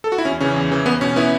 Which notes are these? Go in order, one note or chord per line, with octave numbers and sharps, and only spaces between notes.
A4
F#4
E4
E2 C#4
C#3 E3 C#4
E2
C#3 E3
E2 B3
B2 C#4
B3 E4